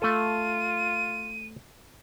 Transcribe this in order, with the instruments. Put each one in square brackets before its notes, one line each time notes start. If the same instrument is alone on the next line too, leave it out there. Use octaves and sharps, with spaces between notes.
[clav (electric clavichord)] A3 A4 [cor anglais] F4 [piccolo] D#7